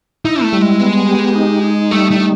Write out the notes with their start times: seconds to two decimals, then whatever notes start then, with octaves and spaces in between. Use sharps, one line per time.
0.25 D#4 E4
0.42 A3
0.53 G3
0.62 G#3
0.80 B3
1.08 G4
1.35 D#4
1.64 D#4
1.91 G3 A3
2.11 A3
2.20 D#4